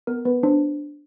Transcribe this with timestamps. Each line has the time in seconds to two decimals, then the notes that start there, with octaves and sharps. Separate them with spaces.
0.07 B3 A#4
0.25 B3 B4
0.43 D4 C5